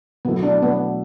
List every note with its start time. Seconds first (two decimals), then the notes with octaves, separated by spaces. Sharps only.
0.25 B2 F#3 A3 B3 E4
0.43 D4
0.63 B3